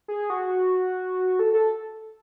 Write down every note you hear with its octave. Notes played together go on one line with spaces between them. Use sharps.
G#4
F#4
A4
A4